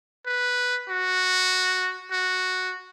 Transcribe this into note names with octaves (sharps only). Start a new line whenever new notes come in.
B4
F#4
F#4